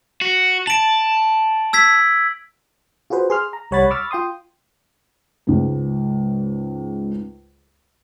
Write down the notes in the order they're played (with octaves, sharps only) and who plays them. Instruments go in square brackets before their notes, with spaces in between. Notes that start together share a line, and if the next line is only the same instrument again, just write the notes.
[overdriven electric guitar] F#4
[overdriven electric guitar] A5 [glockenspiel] D7 F#7
[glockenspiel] E6 G#6 B6
[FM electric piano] F4 F#4 G#4 B4 C5
G#4 C6 F6
A#5
C2 G3 C#5 F#5 B5 A6
B5 C#6 D6 E6 F6 A6
F4 G5 C6 D#6
[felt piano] C#2 G#2